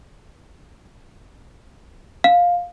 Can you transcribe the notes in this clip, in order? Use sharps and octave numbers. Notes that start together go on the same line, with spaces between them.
F5